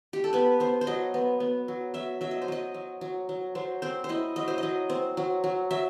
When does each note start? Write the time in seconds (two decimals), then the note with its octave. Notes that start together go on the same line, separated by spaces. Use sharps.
0.13 G4
0.24 A4
0.33 B3 B4
0.60 B3 C5
0.81 C5
0.87 F#3 D#5
1.14 B3
1.40 B3
1.68 F#3
1.94 F#3 E5
2.21 F#3 E5
2.31 D#5
2.42 C5
2.48 F#3 D#5
2.74 F#3
3.01 F#3
3.29 F#3
3.55 F#3 C5
3.82 C4 C5
4.04 C5
4.09 E4 D#5
4.36 F#3 D#5
4.48 C5
4.58 F#3 D#5
4.90 C4
5.17 F#3
5.44 F#3
5.71 F#3 E5